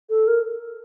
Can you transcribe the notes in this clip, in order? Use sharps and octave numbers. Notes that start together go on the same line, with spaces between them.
A4
A#4